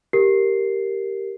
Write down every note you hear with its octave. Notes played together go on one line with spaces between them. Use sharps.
G4 A#4 C7